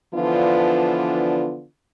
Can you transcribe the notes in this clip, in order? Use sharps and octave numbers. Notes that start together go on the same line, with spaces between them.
D3 E3 F3 B3 D4 F4